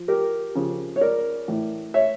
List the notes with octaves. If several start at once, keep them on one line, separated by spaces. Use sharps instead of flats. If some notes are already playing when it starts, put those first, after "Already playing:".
Already playing: F3
G4 A#4
C#3 F3
C#5
A#4 D5
A2 E3
C#5 E5